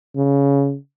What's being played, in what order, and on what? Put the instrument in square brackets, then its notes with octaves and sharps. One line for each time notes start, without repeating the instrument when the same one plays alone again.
[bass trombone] C#3